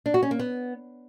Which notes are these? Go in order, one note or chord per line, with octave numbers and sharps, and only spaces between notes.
D4
F#4
C#4
A#3
B3